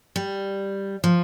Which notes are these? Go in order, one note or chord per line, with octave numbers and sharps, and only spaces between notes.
G3
F3